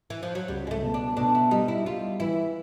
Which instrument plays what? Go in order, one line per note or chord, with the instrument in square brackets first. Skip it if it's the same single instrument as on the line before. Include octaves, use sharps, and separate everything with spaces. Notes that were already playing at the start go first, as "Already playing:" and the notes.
[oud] E3
F3
F#3
[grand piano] C#2 [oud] G3
[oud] G#3
A3
[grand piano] B2
[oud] D4
[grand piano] B2 [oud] D4
[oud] E4
[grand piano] G3 [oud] D#4
[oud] E4
[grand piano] G3 [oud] F4
[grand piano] E3 [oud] E4